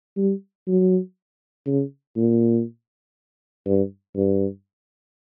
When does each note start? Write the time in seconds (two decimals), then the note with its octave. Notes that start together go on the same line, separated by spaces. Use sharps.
0.17 G3
0.68 F#3
1.66 C#3
2.16 A#2
3.66 G2
4.16 G2